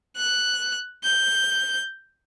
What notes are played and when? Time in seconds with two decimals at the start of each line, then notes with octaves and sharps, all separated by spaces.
0.17 F#6
1.03 G6